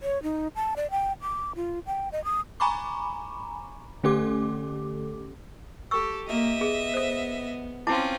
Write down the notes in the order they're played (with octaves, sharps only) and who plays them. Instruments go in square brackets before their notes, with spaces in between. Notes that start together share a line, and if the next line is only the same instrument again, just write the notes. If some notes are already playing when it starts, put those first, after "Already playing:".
[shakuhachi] C#5
D#4
A5
D5
G5
D6
F4
G5
D#5
D#6
[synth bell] G#5 A#5 B5 C#6 D6
D3 A3 C#4 G4 A4 D6
[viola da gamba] G4 [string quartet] A4 [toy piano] C#6 E6
[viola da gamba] A#3 G4 [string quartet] D#5 E5
[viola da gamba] B3 [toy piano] G#4
[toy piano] A4 C5
[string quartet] C4 C#4 F4 [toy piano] E4 A5 D6